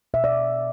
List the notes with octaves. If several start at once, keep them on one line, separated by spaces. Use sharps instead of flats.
B2 E5
D5